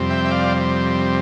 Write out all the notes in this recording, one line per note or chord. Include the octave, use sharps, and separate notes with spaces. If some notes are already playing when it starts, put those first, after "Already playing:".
Already playing: F2 C3 G3 C4
E5 G5
E5
D5 F5